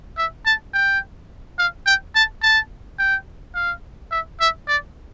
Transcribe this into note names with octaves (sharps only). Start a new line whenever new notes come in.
E5
A5
G5
F5
G5
A5
A5
G5
F5
E5
E5
D5